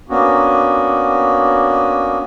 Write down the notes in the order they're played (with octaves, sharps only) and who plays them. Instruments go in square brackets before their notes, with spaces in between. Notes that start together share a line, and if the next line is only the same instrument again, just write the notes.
[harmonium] A#3 B3 C#4 D4 F#4